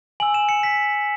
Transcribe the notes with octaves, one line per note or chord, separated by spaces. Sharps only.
G#5 E6 F#7
E7
C#7
B6